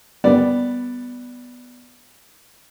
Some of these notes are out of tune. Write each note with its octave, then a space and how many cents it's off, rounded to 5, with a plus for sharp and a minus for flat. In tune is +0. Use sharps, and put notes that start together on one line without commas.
G3 +0 B3 +0 D5 +0